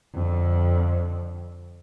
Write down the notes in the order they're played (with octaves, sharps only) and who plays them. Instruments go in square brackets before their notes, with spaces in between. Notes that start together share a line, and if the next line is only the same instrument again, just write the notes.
[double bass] F2 D3